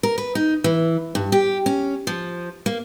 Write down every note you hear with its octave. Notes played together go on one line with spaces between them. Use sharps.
A#4
B4
D#4
E3
G2
G4
C#4
F3
A#3